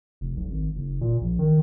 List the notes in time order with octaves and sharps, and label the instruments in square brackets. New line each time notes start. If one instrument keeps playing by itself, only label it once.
[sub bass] F1
B1
G#1
F#1
A#2
A#1
D#3